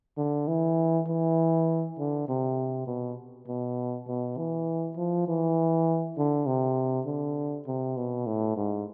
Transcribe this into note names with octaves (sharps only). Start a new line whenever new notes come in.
D3
E3
E3
D3
C3
B2
B2
B2
E3
F3
E3
D3
C3
D3
C3
B2
A2
G#2